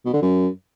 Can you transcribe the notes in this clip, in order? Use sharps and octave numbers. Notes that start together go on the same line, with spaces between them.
B2
D3
F#2